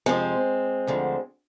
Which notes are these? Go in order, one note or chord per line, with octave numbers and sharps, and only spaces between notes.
F2 C3 F3 G#3 C4
D2 D3 F3